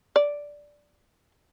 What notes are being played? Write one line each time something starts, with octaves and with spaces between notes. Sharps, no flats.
D5